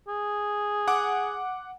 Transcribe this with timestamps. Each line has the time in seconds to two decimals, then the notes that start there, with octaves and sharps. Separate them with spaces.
0.08 G#4
0.88 F#5 D6